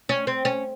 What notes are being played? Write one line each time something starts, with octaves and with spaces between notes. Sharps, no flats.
C#4
C4
C#4